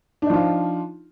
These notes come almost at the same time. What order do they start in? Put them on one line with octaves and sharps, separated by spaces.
D4 D#4 F3 F4